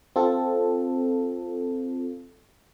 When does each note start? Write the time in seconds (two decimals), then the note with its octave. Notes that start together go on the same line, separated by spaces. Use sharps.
0.16 C4 F4 A4